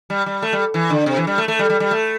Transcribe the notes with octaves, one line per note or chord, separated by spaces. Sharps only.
G3
G3
A3
G3
E3
D3
C3
E3
G3
A3
A3
G3
G3
G3
A3